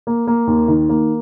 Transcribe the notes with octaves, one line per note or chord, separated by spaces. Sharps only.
A#3
A#3
D#2
D#3
A#3